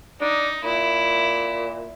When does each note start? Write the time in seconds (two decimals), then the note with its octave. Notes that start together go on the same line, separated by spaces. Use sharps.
0.21 D4 D#4
0.64 A#2 E4